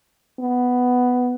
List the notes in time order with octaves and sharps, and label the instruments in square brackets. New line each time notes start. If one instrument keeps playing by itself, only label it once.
[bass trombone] B3